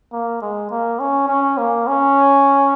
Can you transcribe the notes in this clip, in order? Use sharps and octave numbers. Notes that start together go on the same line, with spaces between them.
A#3
G#3
A#3
C#4
C#4
A#3
C#4